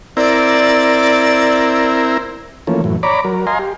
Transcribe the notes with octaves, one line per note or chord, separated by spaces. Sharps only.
C4 E4 A#4 D5
E3 F3 A3 A#3 C#4
F#2 A2 E3
C#5 D5 A#5 B5 D6
F#3 A#4
D#5 F5 G#5 A#5 C6
G4